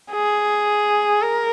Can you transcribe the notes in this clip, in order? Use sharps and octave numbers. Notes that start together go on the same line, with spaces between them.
G#4
A#4